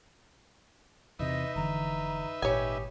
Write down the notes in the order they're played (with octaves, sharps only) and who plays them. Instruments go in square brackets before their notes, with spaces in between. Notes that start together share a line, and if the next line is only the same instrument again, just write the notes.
[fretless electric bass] E2 C3 [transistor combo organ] D#4 B4 E5 [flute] D#5
[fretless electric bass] F1 D3 E3 [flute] A#5
[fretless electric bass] G#1 A#2 [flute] G4 [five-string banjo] C#5 G#5